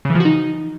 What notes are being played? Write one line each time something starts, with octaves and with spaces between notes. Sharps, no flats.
C#3
E3
F3
F#4
D#4